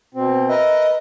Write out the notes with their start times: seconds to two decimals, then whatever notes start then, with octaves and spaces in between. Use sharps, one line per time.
0.14 B2 C4
0.49 A#4 B4 D#5 E5